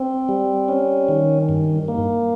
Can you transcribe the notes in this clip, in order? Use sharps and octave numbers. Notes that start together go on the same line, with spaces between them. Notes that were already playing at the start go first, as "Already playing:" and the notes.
Already playing: C4
G3
C#4
D#3
G2
A#3